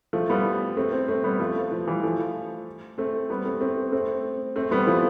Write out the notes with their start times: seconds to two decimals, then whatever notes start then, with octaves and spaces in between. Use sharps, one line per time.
0.13 F3 A3
0.30 G3 B3
0.77 A3 C4
0.92 A3 C4
1.08 A3 C4
1.24 G3 B3
1.40 F3 A3
1.71 F3
1.88 E3 G3
2.03 F3 A3
2.98 A3 C4
3.30 G3 B3
3.45 A3 C4
3.61 A3 C4
3.92 A3 C4
4.56 A3 C4
4.71 G3 B3
4.87 F3 A3